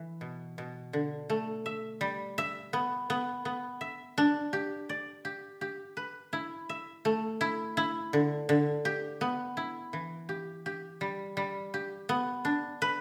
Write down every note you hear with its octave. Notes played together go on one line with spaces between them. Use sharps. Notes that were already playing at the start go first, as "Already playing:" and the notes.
Already playing: E3
B2
B2
D3
A3
E5
G3
E5
B3
B3
B3
E5
D4
G4
D5
G4
G4
B4
E4
E5
A3
E4
E4
D3
D3
G4
B3
E4
E3
G4
G4
G3
G3
G4
B3
D4
B4